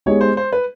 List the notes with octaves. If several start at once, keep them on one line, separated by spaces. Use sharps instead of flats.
G#3 B3 D#4 G4 C#5
C5
C5
B4